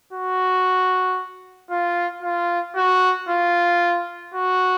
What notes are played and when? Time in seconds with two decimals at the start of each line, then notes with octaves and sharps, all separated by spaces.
0.13 F#4
1.70 F4
2.23 F4
2.76 F#4
3.29 F4
4.34 F#4